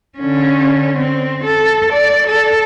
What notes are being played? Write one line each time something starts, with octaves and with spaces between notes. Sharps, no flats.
D3 C#4
C4
A4
D5
A4